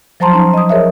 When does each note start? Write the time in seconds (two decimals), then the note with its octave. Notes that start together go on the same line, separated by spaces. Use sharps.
0.20 F3 F#3 C5 A5 A#5 C6
0.33 C#4 D#4
0.54 D#5 D#6
0.69 G#4 A#4 C#5 E5